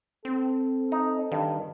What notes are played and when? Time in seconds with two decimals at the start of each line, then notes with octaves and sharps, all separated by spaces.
0.25 C4 A4
0.92 D#4
1.32 G2 D#3